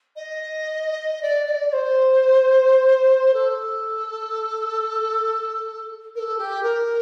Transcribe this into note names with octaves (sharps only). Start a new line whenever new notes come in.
D#5
D5
D#5
D5
D5
C5
A4
A#4
A4
G4
A#4